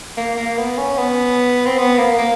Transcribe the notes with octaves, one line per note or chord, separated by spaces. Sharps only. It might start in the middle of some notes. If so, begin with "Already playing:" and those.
A#3
A#3
B3
C#4
B3
C4
B3
A#3
A#3